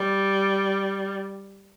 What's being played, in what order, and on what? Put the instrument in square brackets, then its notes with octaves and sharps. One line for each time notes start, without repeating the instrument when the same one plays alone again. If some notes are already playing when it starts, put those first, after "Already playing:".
Already playing: [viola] G3